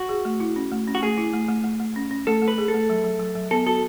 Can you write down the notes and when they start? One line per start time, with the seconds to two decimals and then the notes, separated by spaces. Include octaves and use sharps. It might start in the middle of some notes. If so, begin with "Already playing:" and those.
Already playing: F#4
0.09 G#4
0.25 A3
0.40 E4
0.56 C#4
0.72 A3
0.87 C#4
0.95 F#4
1.02 A3 G#4
1.18 E4
1.33 A3
1.49 A3
1.64 A3
1.80 A3
1.96 C#4
2.11 C#4
2.27 A3 A4
2.42 A3
2.48 B4
2.58 G#4
2.68 A4
2.74 A3
2.90 F#3
3.04 F#3
3.20 F#3
3.35 F#3
3.51 B3 A4
3.66 F#4 A4